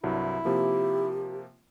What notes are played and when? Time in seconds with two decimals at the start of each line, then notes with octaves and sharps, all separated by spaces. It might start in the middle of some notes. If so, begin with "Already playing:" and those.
0.04 C2 G2 F#3 E4
0.45 C3 F3 A#3 G4